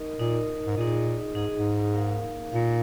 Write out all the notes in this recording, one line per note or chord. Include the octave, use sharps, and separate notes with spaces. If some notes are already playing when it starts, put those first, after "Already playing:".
Already playing: D#4 A#4 D#5
A#2 D#4 A#4 D#5
G#2
A#2 D#4 G#4 D#5
G#2 D#4 G#4 D#5
G#2
A#3 D#4 A#4 F5
A#2 A#3 D#4 A#4 F5